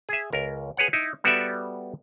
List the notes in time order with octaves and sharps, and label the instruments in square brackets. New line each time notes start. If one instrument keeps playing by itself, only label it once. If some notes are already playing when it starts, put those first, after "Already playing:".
[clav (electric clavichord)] G#4 E5
C#2 A#4
G#4 B4 C#5 F#5
D#4 E4
G3 B3 F#4 A4 D5 E5